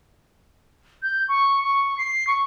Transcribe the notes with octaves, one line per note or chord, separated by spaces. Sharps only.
G6
C#6
C#6
C7
C#6